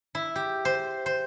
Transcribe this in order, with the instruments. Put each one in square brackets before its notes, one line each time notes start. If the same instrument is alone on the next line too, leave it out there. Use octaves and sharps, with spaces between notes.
[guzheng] E4
G4
C5
C5